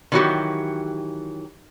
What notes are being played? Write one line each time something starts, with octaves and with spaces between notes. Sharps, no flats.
D#3 E3 F#3 A3 F#4 G4